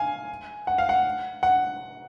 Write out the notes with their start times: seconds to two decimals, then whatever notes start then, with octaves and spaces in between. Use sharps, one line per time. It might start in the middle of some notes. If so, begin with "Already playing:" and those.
Already playing: F5 G#5
0.67 F#5
0.78 F5
0.89 F#5
1.43 F#5